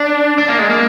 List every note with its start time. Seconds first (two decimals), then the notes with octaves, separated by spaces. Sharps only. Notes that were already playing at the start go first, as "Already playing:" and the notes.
Already playing: D4
0.38 D4
0.48 A#3
0.59 G#3
0.70 A#3